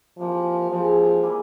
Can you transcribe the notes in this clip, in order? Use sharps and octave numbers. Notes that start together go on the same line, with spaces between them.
C3 E3 F3 A#3
C#3 E3 F3 G#3 C4
G3 A#3 E4 G#4